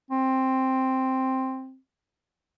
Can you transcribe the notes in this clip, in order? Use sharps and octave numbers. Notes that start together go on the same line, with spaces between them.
C4